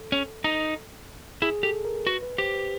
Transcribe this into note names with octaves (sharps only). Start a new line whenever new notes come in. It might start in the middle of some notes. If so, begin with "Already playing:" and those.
Already playing: A4
C#4
D#4
E4 G#4
G4 A4
A#4
F#4 B4
B4
G4 C5
B4